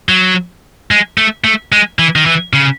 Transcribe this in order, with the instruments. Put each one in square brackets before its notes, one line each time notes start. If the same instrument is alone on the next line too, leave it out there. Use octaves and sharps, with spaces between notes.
[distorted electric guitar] F#3
G#3
A3
A3
G#3
E3
D#3
E3
C#3